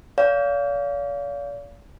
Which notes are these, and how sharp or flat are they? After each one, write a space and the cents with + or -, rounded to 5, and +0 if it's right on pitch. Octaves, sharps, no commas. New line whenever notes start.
D5 -45 F5 +0